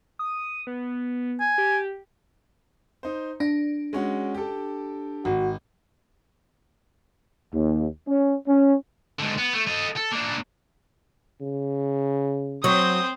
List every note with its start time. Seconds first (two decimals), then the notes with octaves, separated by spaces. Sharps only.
0.19 D#6
0.67 B3
1.40 G#5
1.58 G4
3.03 D#4 C5
3.40 D4 A#6
3.93 G#3 C#4 F#4
4.35 G4 A4
5.25 G#1 F#4
7.54 D#2
8.08 C#4
8.47 C#4
9.19 G#2 D3
9.38 B3
9.54 A3
9.67 A4 D#5
9.96 A4
10.12 A#3 D4
11.41 C#3
12.64 F#3 C4 C5 D#6